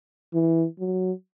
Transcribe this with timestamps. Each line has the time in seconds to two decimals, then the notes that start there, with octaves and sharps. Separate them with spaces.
0.34 E3
0.80 F#3